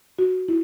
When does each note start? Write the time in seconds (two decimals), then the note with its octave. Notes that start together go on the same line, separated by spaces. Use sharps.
0.18 F#4
0.48 E4